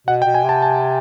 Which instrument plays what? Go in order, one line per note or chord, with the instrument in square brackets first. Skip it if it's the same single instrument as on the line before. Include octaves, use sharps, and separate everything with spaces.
[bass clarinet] B2 [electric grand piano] F#5
[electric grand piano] G5
[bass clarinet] B2
[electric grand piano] G#5
[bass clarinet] C3 [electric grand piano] A5
[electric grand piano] A5